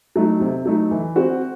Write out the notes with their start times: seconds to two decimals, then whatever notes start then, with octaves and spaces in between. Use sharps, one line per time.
0.16 F#3 A3 D#4
0.40 C3
0.65 F#3 A3 D#4
0.91 E3
1.16 C4 F#4